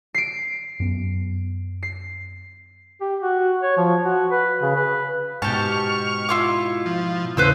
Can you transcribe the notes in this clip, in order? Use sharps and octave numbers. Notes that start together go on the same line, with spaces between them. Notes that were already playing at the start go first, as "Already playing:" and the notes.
C7 D7
F#2 B3
C7
G4
F#4
C#5
F3
F#4
B4
C#3
B4
G#2 B2 G4 A5 C#6 F6
E4 F4 D6
F3
E2 A2 C#3 B4 C5 E6